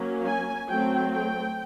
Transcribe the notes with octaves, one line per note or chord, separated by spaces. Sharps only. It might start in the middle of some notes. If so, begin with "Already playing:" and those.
Already playing: F#3 A#3 C#4
G#5
F#3 A3 C4 G5
G5